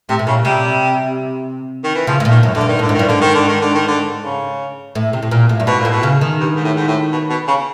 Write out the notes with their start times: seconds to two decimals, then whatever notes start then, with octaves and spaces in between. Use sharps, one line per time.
0.09 A2 C3
0.19 A2
0.27 A#2 C#3
0.45 C3 G3
1.84 D#3
1.95 E3
2.07 C#3 F3
2.20 A2
2.25 A#2
2.31 D#3
2.43 F#2
2.55 F#2 D3
2.61 G2
2.68 D#3
2.79 A2 D3
2.89 G#2
2.95 G2 D#3
3.08 G#2 D3
3.21 D#3
3.35 D3
3.48 D#3
3.61 D3
3.75 D#3
3.88 D3
4.23 C#3
4.95 A2
5.13 C3
5.23 A2
5.31 A#2
5.49 A2
5.60 G2
5.67 G#2 B2
5.79 A#2
5.85 A2
5.92 B2
6.03 C#3
6.21 D#3
6.40 G2
6.56 G#2
6.64 A2
6.76 G#2
6.87 A2
7.12 B2
7.29 B2
7.48 C#3